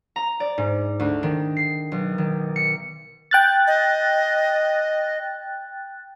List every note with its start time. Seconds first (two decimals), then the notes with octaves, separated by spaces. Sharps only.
0.16 A#5
0.40 D5
0.58 G#2
1.00 D2
1.23 D#3
1.57 C7
1.92 B1
2.18 D#3
2.56 C#7
3.31 G5 F#6 A6
3.67 D#5